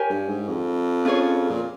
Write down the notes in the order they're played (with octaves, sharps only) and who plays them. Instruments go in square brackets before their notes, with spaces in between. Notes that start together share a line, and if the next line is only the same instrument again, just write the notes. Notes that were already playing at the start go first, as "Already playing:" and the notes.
Already playing: [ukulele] G4 A#4 C#5 G#5
[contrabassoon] G2
G#2
F2
[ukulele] C#4 F4 G#4 C#5
[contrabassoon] A#2